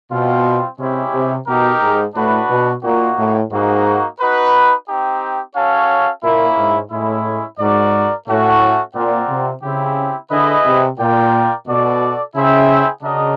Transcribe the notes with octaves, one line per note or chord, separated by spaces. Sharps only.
B2 G3 C4 F4
C3 G#3 C#4 E4 G4
C3
B2 D#4 G4 A#4
G#2
A2 D4 F#4 B4
B2
A#2 A#3 D#4 F#4
A2
G#2 A#3 D#4 F#4
D#4 F#4 B4
C4 D#4 G4
C#4 F#4 A4 C#5 F5
A#2 A#3 C#4 E4
G#2
A2 G#3 C#4 E4
G#2 F#4 A#4 D5
A2 A3 C#4 F#4
A#2 C4 F4 A#4 D5 F#5
C3
C#3 C4 E4 G4
D3 E4 G#4 B4 D#5
C3
A#2 F4 A#4 D5 G5
B2 F#4 A4 D5
C#3 E4 G#4 C5 E5 G5
C#3 D4 F#4 A#4 D#5